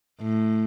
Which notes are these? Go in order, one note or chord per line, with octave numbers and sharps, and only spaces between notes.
A2